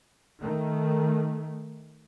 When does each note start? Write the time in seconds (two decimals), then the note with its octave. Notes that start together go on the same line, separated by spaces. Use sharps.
0.42 D#3 A3